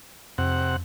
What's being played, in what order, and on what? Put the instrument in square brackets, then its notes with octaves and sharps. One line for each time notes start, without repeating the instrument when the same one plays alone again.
[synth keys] F2 [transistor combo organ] C3 F#5